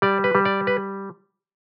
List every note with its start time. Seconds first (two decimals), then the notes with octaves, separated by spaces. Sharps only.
0.02 G3 D5
0.24 B4
0.35 G3
0.45 D5
0.67 B4